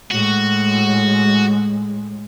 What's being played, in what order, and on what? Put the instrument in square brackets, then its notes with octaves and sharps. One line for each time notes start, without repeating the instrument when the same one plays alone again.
[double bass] A2 G#3 [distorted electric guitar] F#4